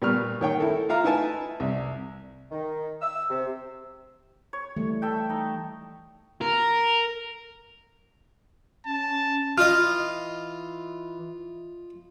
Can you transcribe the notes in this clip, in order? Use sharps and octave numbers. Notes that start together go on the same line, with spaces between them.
A#2 G3 B3 C#6 F6
D#3 C#5 G5
E4 A4 A#4
F4 E5 F5 A#5
D#4 E4 B4 E5 G#5 A5
C2
D#3
E6
C3
C#5
E3 G3 A3
A4 E5 G5
D#4
A#4
C#4 A5
E3 F4 D#5 D#6 F6